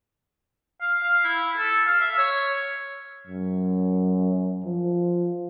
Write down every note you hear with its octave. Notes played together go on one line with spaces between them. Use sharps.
F5
F5
E4
A4
F5
E5
C#5
F#2
F3